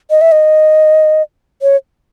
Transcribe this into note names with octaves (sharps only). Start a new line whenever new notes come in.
D#5
E5
D#5
C#5